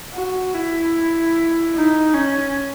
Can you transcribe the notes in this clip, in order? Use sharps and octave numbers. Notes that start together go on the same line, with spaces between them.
F#4
E4
D#4
C#4